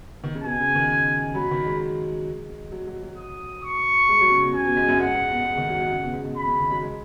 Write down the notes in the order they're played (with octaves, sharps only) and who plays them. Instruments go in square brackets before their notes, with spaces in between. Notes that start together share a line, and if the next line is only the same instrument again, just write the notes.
[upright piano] D#3
C#3
[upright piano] B2 [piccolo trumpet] G#5
[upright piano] C#3
D#3
[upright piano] F#3 [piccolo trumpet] B5
[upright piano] D#3
G#3
F#3
F#3
F#3
[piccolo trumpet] D#6
C#6
[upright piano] G#3
F#3
C#3
B2
[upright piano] C#3 [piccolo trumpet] G#5
[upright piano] B2
G#2
F#2
[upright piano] G#2 [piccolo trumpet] F#5
[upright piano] G#2
B2
G#2
D#3
F#3
F#3
C#3
B2
G#2
B2
[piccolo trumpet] B5
[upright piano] C#3
D#3
F#3
G#3